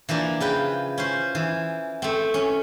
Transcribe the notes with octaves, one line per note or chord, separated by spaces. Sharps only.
E3 F3 A#3 D4
C#3 B4 G5
C#4 C5
E3
A3 C4
C#4